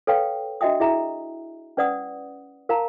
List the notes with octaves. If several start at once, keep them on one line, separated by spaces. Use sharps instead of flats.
A4 B4 C#5 F5 G5 C#6
D4 F#4 D#5 E5 G5 D#6
E4 G#4 E5 A#5
C#4 B4 D5 F#5 D#6
A#4 F5 A5 A#5